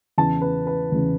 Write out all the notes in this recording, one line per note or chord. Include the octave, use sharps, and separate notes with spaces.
E2 C#3 E3 A5
B4
B4
E2 C#3 E3